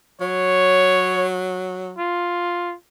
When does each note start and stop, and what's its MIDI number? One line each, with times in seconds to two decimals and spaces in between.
0.21 1.93 54
0.21 1.31 73
1.98 2.75 65